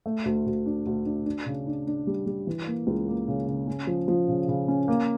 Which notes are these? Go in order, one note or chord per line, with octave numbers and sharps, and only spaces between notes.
A3
D2
D2
D4
D2
D4
D4
C#3
D4
D4
G3
G3
E3
A#3
C#2
A#3
C#3
C#3
C#4
F3
F3
C#3
C#3
C#4
A#3